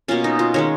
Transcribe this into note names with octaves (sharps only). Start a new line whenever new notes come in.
B2 A#3 C#4 F4
D#4
F4
D#3 G#3 C#4 C#5